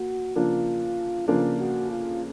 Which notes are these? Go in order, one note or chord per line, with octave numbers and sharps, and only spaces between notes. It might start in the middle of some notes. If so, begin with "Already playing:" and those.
Already playing: A#3 F#4
C#3 F3 A#3 D4 F4
C#3 F3 A#3 D4 F4
F#4
F4